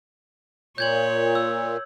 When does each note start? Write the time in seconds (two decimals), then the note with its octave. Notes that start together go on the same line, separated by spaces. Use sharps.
0.78 A#2 C#5 G6 G#6 F#7
1.35 E6